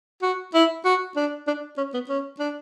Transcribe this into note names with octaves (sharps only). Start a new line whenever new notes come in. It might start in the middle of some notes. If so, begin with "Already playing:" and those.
F#4
E4
F#4
D4
D4
C#4
B3
C#4
D4